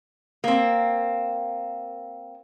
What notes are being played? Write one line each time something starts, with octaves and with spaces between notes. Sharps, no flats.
A#3 C4